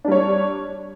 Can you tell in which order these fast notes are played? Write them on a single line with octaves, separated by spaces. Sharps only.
D4 G3 C#5